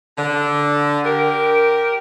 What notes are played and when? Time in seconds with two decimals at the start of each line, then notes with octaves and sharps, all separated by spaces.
0.18 D3
1.05 G4 A#4